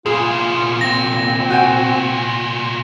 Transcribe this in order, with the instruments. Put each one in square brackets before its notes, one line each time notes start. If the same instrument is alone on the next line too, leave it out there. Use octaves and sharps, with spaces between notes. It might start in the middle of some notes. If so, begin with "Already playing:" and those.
[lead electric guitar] C2 A#2 [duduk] F4 [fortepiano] G#4
[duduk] C4 [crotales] A#6
[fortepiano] F#4 G5 G#5